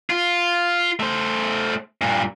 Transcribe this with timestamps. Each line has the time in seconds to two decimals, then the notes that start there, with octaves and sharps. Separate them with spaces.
0.10 F4
1.00 A3 C5
2.02 G2 A#2